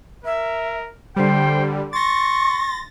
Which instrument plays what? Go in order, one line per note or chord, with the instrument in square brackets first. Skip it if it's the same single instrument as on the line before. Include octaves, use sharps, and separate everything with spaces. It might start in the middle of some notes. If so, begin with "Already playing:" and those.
[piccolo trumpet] A#4 [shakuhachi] E5
[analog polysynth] D3 G3 [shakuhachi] C5 [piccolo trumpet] G5
[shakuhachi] C6 [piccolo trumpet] C#6 [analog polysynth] A6 A#6